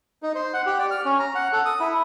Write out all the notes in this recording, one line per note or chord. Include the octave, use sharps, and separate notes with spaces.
D#4
C5
F#5
G4
D5
F6
C#4
A#5
F#5
A4
D#6
E4